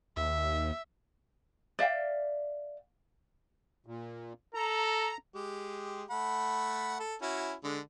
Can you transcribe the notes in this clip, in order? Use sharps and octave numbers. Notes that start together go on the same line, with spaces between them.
D#2 E5
D5 E5 F5 G5
A#2
A4 A#5
G#3 G4
A3 F#5 B5
A4
C#4 E4 F#4
D3 G#3